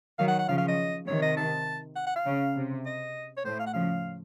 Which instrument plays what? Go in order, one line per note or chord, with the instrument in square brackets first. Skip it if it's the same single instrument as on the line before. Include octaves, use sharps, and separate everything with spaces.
[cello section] D#3 F#3 [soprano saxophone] F5
[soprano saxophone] F#5
F#5
[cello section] C#3 F3 [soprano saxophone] F5
[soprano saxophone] F5
D#5
[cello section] C3 D#3 [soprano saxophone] C#5
[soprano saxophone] D#5
A5
F#5
F#5
F5
[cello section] C#3
C3
[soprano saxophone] D#5
C#5
[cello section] A2 [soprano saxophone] C5
[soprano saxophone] F5
F#5
[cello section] C#3 F3 [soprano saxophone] F5